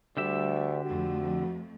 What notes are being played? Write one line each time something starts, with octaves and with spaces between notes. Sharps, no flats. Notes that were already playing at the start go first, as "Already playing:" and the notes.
D2 D3 G3 G4 E5
F2 A3 F#4